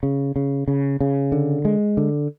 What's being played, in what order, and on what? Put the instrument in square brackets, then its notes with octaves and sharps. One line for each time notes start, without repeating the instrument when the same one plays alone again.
[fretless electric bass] C#3
C#3
C#3
C#3
D3
G#3
D3